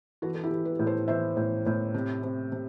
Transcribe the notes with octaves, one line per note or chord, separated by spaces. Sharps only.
E3 F#4 A4
A4
E4 G4
E3
G4 B4
A2
A4 C5
E3 C5 E5
A2
A2
C3
C3
C3